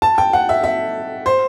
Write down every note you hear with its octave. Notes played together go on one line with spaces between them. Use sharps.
A5
G5
F#5
E5
E5
C5